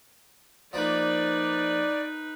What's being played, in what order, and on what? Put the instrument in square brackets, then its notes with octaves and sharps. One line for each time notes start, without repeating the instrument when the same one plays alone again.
[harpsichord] F3 A#3 [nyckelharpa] D#4 B4 [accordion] D5